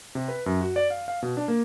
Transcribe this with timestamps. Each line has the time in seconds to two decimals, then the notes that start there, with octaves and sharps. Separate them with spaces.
0.15 C3
0.28 B4
0.46 F#2
0.61 F#4
0.76 D5
0.90 F5
1.08 F5
1.23 B2
1.37 D4
1.48 A#3